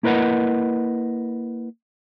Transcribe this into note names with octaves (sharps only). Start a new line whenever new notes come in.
A#3 E4 A#4 B4 D#5 F#5